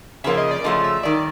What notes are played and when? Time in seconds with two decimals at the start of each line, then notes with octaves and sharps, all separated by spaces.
0.24 C#3 F3 A#3 C#4 E5
0.37 D#5
0.51 D5
0.64 C#3 F3 A3 C#4 F4 D#5
0.84 E5
1.03 D#3 G3 D5